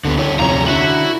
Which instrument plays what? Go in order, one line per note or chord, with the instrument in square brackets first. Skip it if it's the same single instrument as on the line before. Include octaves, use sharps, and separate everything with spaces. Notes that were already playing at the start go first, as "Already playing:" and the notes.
[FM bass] D2 [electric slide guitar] D3 A#3 B3
[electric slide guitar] E4 G#4 C#5
[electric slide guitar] F2 C3 C#4 [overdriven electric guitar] A#5
[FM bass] D3 [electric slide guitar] E4 [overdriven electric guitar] F#4